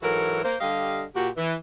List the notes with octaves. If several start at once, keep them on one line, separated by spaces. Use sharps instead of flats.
G#2 E3 F#3 F#4 A4 A#4
A#3 C5
D3 G3 G4 D#5 F5
A#2 F#4 G4
E3